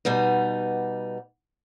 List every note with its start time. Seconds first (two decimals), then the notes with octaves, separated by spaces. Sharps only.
0.05 B2 G3 B3 D#4